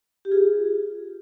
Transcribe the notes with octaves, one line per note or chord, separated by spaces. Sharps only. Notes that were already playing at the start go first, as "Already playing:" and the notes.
G4
F4 G#4